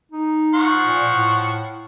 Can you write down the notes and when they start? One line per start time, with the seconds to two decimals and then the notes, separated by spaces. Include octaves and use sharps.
0.12 D#4
0.54 F3 F#5 C#6
0.86 A#2
1.07 A2